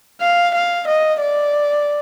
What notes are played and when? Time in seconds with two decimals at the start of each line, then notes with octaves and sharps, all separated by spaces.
0.21 F5
0.55 F5
0.88 D#5
1.22 D5